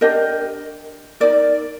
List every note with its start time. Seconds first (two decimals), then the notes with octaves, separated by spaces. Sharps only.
0.01 D4 G4 A#4 D#5
1.20 D#4 A#4 D5